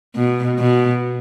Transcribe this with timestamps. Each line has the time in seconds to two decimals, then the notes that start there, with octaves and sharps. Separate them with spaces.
0.16 B2
0.59 B2